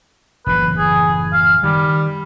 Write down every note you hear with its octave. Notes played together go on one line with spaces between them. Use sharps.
F#1 A2 E3 B4
G#4
F5
D#3 G3